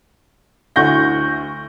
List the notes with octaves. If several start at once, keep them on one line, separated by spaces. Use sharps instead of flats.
D2 E4 F#5 C#6 G6 A#6